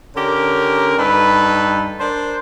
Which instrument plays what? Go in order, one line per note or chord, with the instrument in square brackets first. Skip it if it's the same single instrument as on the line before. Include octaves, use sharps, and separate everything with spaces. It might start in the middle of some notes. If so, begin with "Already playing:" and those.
[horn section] D3 C#4 G4 A#4
G2 D#4 A4 B4
D4 A#4 C5